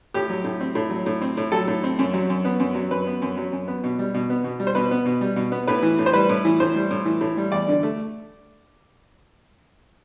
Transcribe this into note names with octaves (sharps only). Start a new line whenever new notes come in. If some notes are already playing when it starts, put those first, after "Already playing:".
A2 G4
F#3
A2
C4
A2
F#3
A2
C4
A2
F#3 A4
A2
C4
F#2
F#3
F#2
B3
F#2
F#3
F#2 B4
B3
F#2
F#3
F#2
B3
B2
G3
B2
B3
B2
G3
C5
B2 B4
B3
B2
G3
B2
B3
A2 B4
E3
A2
C5
G3 B4
A2
E3
A2 C5
G3
A2
E3
A2
G3
E2 D5
D3
A3